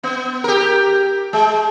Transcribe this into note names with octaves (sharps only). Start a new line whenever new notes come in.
B3
G4 A#4
G#3